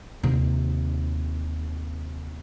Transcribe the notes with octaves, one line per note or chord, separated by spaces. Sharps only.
D#2 C3